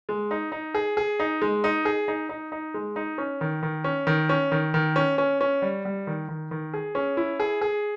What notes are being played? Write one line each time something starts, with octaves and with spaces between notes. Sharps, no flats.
G#3
D#4
D#4
G#4
G#4
D#4
G#3
D#4
G#4
D#4
D#4
D#4
G#3
D#4
C#4
D#3
D#3
C#4
D#3
C#4
D#3
D#3
C#4
C#4
C#4
G3
G3
D#3
D#3
D#3
G#4
C#4
E4
G#4
G#4